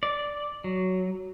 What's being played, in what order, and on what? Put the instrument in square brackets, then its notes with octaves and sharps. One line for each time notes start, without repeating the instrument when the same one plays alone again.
[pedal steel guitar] D5
F#3